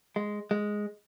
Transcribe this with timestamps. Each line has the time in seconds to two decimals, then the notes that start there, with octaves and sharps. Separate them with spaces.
0.16 G#3
0.51 G#3